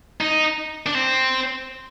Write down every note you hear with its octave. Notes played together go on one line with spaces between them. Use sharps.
D#4
D4
C4